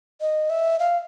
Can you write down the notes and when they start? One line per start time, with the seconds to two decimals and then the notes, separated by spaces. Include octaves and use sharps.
0.21 D#5
0.50 E5
0.79 F5